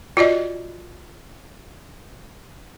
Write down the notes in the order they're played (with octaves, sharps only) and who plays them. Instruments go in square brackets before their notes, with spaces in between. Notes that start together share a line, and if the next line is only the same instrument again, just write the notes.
[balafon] F4 F#4 D5 D#5